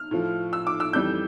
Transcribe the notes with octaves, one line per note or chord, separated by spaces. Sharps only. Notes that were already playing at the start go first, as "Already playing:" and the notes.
Already playing: F6
A2 F3
E6
D6
E6
F2 E3 G3 G6